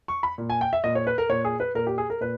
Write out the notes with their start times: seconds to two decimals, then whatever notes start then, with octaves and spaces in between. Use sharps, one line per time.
0.08 C#6
0.23 B5
0.38 A#2
0.50 G#5
0.61 G5
0.73 E5
0.84 A#2 D#5
0.95 C#5
1.07 B4
1.18 A#4
1.29 A#2 C#5
1.45 G#4
1.60 B4
1.75 A#2 A#4
1.87 G4
1.98 G#4
2.10 A#4
2.21 A#2 B4